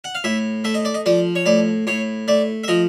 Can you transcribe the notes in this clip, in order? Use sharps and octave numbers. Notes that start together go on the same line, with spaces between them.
F#5
F5
A2 E5
A3 E5
D#5
D5
D#5
F3 D5
C#5
A2 D5
A2 C#5
A3 D5
E5
F3 D#5